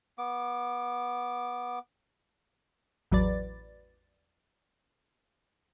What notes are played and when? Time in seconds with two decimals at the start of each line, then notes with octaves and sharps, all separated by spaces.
0.18 B3 D6
3.12 A1 E2 F#3 B4 D5 A6